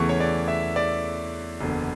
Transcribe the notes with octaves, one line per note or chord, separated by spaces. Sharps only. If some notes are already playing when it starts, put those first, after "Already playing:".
Already playing: E2 C#3 E3 A3 C#6
C#5
D5
E5
D5
F#1 E2 D3